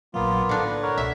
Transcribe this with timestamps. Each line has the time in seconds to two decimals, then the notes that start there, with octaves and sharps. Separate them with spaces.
0.14 A#1 A#2 F#3 A#3 B3 F4
0.49 A2 D3 D4
0.66 B4
0.82 A#4 C#5 F#5
0.98 C#2 B2 E5 B6